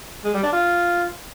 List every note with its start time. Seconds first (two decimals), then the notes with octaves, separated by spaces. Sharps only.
0.24 G#3
0.34 G3
0.43 D4
0.53 F4